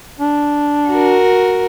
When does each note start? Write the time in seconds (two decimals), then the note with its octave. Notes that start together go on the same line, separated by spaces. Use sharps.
0.19 D4
0.88 F#4 A#4